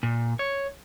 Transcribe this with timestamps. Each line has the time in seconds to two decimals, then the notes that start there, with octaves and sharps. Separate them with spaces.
0.03 A#2
0.39 C#5